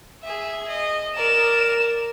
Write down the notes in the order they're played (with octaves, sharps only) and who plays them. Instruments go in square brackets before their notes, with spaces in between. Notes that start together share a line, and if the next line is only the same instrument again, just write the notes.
[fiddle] G#4 E5
D#5
[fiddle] A#4 D5 [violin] E7